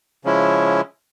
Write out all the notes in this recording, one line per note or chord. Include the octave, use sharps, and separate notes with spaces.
C#3 F3 G#3 C#4 E4